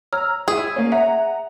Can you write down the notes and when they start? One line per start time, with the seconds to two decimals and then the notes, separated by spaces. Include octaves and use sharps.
0.13 C#5 A#5 E6 F6
0.48 E4 G#4 D#6
0.76 A#3 C#4
0.92 E5 F#5 A#5